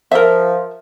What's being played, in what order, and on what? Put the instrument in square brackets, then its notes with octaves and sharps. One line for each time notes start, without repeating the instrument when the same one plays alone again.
[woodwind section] F3 [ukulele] A#4 E5